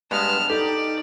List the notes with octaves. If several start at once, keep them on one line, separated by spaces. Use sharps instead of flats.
G2 G#3 B3 A5 F6
D#4 G4 A4 D5